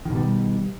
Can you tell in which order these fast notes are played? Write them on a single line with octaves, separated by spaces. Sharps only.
D#3 B2 G3